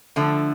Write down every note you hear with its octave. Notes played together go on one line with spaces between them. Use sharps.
D3 F3 A3